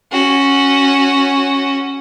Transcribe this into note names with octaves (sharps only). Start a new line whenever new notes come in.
C#4 F#4